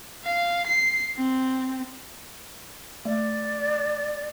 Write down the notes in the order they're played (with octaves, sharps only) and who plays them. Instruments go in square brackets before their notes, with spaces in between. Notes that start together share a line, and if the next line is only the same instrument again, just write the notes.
[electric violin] F5
C7
C4
[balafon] A3 [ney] D5